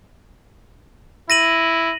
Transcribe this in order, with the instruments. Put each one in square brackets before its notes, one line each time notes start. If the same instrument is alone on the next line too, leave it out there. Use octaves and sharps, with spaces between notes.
[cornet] E4 [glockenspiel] A#6 D#7 F#7